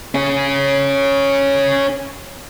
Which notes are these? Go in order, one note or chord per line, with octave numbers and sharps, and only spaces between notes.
C#4 G#4